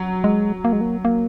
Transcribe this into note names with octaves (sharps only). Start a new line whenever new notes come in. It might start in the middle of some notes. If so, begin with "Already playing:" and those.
Already playing: F#3
G#3
A#3
G#3
A#3
A#3